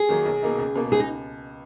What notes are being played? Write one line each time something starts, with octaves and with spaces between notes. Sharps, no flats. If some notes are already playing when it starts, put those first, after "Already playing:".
Already playing: G#4
D#3 F#3 A#3
B1
B2 A#3 D#4
C#2
B2 A#3
C#2 G#4
D#4